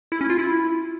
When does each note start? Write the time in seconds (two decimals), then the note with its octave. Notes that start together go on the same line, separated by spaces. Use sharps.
0.12 E4
0.21 C#4
0.30 F4
0.39 E4